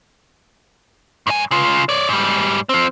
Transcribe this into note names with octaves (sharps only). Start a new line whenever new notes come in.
G2 G#5
C#3 F4
C#5 D5
G#2 G3
F3 C4